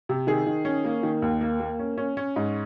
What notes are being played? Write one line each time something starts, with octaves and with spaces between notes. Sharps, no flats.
C3
D#3 G#4
D#3
C#4
A#3
D#3
D#2
A#3
A#3
C#4
C#4
C#4
G#2